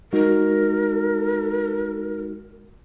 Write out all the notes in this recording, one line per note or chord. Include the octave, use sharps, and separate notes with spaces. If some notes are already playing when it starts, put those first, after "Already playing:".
G#3 D#4 F#4 A#4